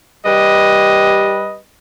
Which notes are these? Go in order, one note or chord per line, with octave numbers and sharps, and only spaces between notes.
G3 G4 B4 D#5